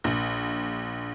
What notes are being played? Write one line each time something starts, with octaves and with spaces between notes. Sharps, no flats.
A#1